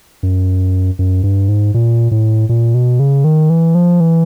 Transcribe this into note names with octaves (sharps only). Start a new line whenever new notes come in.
F#2
F#2
G2
G#2
A#2
A2
A#2
B2
C#3
D#3
E3
F3
E3